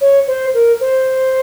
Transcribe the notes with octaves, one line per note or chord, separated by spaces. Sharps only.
C#5
C5
A#4
C5